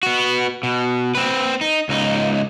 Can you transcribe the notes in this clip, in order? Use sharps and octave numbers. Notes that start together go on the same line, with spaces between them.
B3 F#4
B2
C4 B4
D#4
C#2 D#4